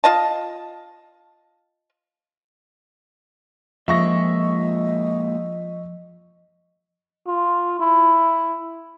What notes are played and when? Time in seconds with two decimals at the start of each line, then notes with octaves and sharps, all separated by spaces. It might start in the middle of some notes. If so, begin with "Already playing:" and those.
0.04 F4 D#5 A5
3.88 A#2 F3 G#3 A#3 D#5 E5 C#6 A#6
7.27 F4
7.80 E4